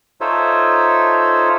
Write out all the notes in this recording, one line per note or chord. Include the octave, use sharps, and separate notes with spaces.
D#4 F4 A4 C5 C#5 E5